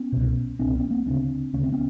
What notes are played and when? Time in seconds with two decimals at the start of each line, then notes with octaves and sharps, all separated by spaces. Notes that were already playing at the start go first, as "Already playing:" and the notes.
Already playing: B3 C#4
0.12 C2 B2
0.59 C2 B2 C4 D4
0.75 B3 C#4
0.90 A#3 C4
1.06 D2 C#3 C4 D4
1.53 D2 C#3 C#4
1.63 C4
1.72 B3 C#4